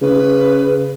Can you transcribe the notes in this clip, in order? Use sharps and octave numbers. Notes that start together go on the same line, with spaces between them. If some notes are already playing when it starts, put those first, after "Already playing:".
C#3 B4